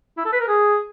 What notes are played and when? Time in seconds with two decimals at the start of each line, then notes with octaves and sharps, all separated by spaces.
0.18 E4
0.25 A4
0.33 B4
0.40 A#4
0.48 G#4